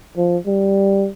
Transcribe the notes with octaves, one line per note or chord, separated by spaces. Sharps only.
F3
G3